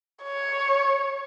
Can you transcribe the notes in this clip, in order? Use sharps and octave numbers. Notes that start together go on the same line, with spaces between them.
C#5